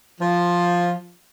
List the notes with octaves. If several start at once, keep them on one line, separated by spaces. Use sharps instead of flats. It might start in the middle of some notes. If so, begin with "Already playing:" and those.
F3